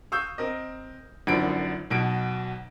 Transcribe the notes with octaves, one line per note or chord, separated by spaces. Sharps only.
F5 C#6 D#6 E6 G6
C4 A#4 D#5
G#1 F#2 D3 F3 B5 D7
B1 B2 D7